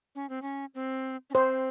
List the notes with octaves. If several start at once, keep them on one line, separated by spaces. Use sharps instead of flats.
C#4
C4
C#4
C4
C#4
C4 C5